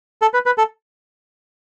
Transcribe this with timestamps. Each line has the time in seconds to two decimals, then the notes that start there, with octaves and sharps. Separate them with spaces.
0.22 A4
0.34 B4
0.46 B4
0.58 A4